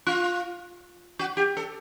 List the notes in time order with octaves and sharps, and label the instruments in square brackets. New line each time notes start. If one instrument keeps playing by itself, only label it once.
[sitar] F4
F#4
G4
A4